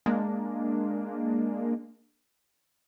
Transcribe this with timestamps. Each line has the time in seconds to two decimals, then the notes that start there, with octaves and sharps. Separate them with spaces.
0.06 G#3 A#3 D4